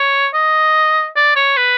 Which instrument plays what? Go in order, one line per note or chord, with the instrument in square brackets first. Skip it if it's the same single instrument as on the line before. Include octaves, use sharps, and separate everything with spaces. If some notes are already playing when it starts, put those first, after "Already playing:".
Already playing: [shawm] C#5
D#5
D5
C#5
B4